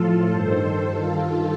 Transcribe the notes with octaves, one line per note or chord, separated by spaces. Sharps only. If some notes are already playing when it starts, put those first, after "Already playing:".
Already playing: A2 F3 F4 A4
G2 D#3 A4 C5
G2 D#3 F4 A4
F4